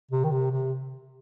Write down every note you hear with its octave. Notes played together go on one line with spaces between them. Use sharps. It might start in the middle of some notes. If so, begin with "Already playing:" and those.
C3
D#3
C3
C3